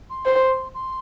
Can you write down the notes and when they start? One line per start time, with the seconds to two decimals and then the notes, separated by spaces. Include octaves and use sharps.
0.10 C6
0.26 C5
0.74 C6